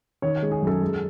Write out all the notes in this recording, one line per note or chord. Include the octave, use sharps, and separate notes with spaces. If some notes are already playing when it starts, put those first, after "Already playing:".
D#3 C#5
G#3
G#4
F#2 A4
G#3